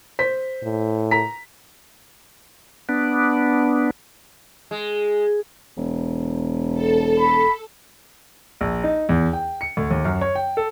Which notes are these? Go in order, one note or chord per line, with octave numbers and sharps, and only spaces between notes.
C5 B6
A2
A#5 B6
B3 D4
G#3
E1
A4
B5
A#1
D#4
E2
G5
C#7
D2
D#2
F#2
C#5
G5
A4